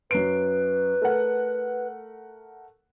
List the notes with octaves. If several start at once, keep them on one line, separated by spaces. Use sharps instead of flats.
F#2 B4 C7 D7
A3 A#4 F#5